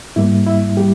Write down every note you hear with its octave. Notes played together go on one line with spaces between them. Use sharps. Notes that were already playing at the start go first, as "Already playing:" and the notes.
G#2 G3 A#3 E4
E4
G3 G4